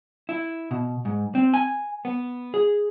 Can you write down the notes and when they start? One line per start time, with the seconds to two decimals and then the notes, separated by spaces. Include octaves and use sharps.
0.29 E4
0.71 B2
1.05 G#2
1.35 C4
1.54 G#5
2.05 B3
2.54 G#4